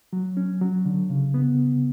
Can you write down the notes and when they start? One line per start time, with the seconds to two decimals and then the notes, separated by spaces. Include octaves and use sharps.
0.13 F#3
0.37 C#4
0.61 F#3
0.85 D3
1.10 C#3
1.34 B3